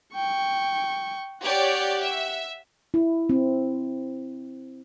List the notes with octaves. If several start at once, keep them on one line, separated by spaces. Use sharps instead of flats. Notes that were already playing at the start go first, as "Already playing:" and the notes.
G5 C#6
G4 C#5 D5 F#5
E5
E4
C4